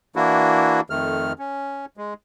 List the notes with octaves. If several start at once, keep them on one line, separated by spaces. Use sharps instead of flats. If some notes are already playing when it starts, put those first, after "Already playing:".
E3 A#3 D4 E4 F#4
F2 D#3 A3 F6
C#4
G#3